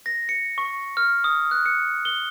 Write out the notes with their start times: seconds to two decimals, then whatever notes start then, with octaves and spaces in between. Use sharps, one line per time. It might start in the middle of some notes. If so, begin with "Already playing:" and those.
0.06 A#6
0.29 C#7
0.58 C#6
0.97 F6
1.24 D#6
1.51 F#6
1.66 C#7
2.05 G7